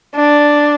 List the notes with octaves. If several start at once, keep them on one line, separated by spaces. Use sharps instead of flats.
D4